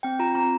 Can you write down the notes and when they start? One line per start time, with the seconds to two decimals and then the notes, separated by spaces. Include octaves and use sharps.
0.03 C4 G5
0.19 F4 A#5
0.35 C4 A#5